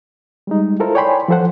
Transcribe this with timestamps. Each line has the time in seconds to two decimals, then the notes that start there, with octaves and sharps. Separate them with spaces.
0.47 G3 G#3 D#4
0.80 E4 F4 A4 A#4 C5
0.95 C#5 D5 G5 G#5 B5 C6
1.28 F3 F4 A4 C5 F#5